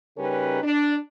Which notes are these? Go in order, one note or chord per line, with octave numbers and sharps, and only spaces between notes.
C#3 G3 C#4 D#4 A#4 B4
D4